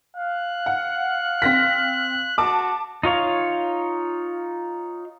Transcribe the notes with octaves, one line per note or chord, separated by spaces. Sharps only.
F5 F#6
F#5
C4 A#6 B6
F#4 A5 D6
D#4 F4 C#5 F5